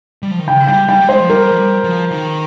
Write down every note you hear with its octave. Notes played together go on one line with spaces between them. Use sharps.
G3
F3
D#3
C#3 G5
G3 G5
G3 G5
G3
G#3 C5
F3
G3 A#4
F3
G3
F3
D#3